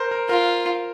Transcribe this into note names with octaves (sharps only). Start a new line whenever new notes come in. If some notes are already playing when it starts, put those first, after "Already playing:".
Already playing: A#4 C5
A#4
F4 A#4